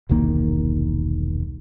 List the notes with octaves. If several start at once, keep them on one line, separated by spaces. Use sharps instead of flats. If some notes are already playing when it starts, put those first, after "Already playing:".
E1 C2 D#3 A#3